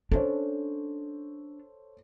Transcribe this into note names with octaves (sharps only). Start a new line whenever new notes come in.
C#4 D4 A4 C5 C#5